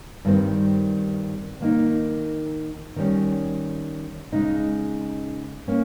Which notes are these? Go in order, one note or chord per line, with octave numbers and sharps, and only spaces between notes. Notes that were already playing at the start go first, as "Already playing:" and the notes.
G2 D#3 G3 C4
D#3 A#3 D#4
D#3 G3 C#4
C#3 G#3 D#4
A#3 C#4